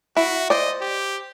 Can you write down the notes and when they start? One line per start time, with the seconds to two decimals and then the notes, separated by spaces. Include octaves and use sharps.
0.17 E4 F#4
0.50 C5 D5 D#5
0.81 G4